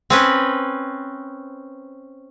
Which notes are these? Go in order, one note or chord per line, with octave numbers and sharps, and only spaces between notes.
C4 C#4 B4